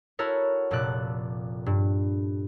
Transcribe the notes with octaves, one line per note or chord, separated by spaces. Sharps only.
E4 F#4 A4 A#4 C#5
F1 A#2 A4 D5 F#6
G2